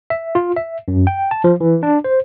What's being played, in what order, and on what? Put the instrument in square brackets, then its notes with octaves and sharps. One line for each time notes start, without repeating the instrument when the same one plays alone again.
[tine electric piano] E5
F4
E5
F#2
G5
A5
F3
E3
D4
C5